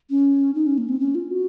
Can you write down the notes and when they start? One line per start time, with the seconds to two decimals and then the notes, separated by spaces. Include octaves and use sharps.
0.10 C#4
0.55 D#4
0.67 C#4
0.78 A#3
0.89 C4
1.00 C#4
1.15 F4
1.30 F#4